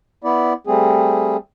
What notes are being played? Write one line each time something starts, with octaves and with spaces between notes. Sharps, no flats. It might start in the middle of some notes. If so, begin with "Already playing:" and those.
B3 E4 D5
G3 A3 C4 G#4